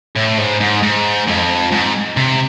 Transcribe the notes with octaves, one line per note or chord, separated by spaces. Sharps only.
A2
G#2
G#2
G#2
F2
G#2
C3